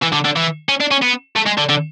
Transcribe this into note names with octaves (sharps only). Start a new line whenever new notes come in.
E3
D3
D3
E3
C#4
D4
C#4
B3
A3
G#3
D3
D3